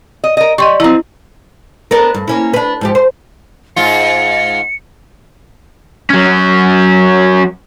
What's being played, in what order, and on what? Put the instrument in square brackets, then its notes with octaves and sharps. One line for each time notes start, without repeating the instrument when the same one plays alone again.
[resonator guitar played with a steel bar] D#5
A#4 D#5
[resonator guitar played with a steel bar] G3 [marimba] D#5 C6 C#6
[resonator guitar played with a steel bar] F3 C4 [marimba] E4 A#5
[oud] B3 D4 A#4
G2
A#3 C#4 E4
D4 B4
G#2 F3 G4
C5
[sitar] G#2 F4 [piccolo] C#7
[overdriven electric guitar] F#3 C#4